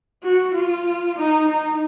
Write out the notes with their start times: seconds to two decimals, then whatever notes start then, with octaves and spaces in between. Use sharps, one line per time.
0.24 F#4
0.55 F4
1.18 D#4
1.49 D#4